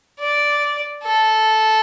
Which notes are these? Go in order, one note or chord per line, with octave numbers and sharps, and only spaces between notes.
D5
A4